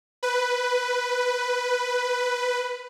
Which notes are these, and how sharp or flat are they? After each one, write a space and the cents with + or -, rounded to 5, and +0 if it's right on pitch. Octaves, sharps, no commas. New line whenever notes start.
B4 +5